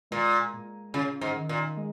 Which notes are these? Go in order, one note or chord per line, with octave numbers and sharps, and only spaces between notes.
A#2 G#3
A#2
C#3 F4
G#2
D#3
A#2
G#3